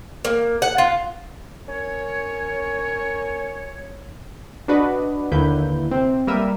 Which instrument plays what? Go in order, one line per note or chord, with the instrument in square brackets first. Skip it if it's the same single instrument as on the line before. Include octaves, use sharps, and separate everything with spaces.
[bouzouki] A#3
F#5
F4
[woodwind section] C#4 A#4 C#5
[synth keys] D4 F#4 B4 D5 D#5
D#2 D3 A#3 E4 B4 G6
C3 C4
G3 A#3 A#4 B4 E5 D#7